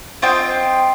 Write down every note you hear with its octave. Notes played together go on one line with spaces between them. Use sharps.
C4 F4 D#5 G5